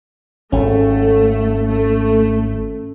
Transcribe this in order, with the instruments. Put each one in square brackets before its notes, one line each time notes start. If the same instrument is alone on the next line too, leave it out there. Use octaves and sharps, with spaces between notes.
[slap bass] G#1 [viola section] A3 [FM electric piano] C#4
[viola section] A3